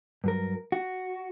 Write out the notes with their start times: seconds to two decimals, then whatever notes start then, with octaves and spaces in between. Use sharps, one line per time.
0.24 G2 F#3 A#4
0.72 F#4